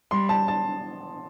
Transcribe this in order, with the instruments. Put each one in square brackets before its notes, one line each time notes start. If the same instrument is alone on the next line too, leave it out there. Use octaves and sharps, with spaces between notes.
[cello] G3 [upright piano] C6
[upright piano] A5
A5